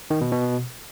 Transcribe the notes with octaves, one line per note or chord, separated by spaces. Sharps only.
D#3
B2
B2